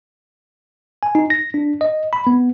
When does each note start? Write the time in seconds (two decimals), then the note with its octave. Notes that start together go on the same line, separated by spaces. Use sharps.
1.03 G#5
1.15 D#4
1.30 A#6
1.54 D4
1.81 D#5
2.13 B5
2.27 B3